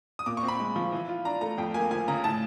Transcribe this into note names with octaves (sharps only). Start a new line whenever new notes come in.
D#6
A#2 D6
C#6
C4
B5
G#3
F3
E3
F4
D4 A#5
A3 A#5
F2 G5
A#3 G#5
F3 G#5
C#3 A#5
A2 A5